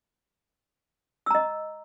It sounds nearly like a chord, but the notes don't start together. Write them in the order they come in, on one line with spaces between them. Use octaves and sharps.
E6 A#5 D#5